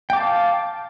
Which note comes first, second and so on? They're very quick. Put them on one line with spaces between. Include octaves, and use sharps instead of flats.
G5 D6 A5 F5